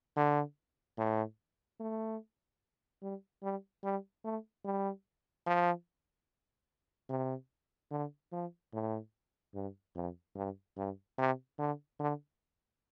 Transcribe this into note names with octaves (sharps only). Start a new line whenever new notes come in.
D3
A2
A3
G3
G3
G3
A3
G3
F3
C3
D3
F3
A2
G2
F2
G2
G2
C3
D3
D3